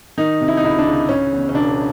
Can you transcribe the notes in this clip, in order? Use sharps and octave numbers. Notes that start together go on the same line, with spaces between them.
D#3 D#4
C3
E4
D#4
C#2 E4
D4
C#2
C#3 C#4
E2
C#4
E1 D4